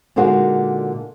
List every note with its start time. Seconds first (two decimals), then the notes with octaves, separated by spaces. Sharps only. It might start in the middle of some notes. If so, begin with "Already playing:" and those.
0.16 A#2 D3 G#3 D#4 F#4